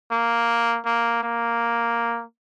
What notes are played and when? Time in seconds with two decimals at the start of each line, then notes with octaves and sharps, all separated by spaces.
0.11 A#3
0.85 A#3
1.23 A#3